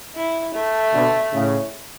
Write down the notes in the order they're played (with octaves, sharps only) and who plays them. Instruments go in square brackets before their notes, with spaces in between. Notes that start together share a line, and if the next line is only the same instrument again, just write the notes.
[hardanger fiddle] E4
A3
[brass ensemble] B2 D3
A2 C#3